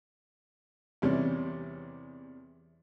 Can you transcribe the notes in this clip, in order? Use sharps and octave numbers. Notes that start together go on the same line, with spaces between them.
E2 C3 G3 C#4